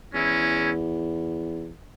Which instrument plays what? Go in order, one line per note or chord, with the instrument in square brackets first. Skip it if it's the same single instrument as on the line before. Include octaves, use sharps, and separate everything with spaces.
[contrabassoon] E2 [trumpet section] G#3 C#4 E4